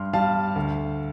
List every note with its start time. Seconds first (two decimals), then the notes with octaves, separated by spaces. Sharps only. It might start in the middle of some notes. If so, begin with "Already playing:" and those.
Already playing: G2 C6 F6
0.13 G3 F5 A5
0.56 D2